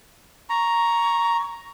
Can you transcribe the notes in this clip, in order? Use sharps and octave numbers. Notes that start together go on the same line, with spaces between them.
A#5 C#6